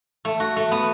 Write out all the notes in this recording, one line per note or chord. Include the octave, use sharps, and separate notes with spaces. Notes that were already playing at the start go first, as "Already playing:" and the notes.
A3
F#4
A3
B3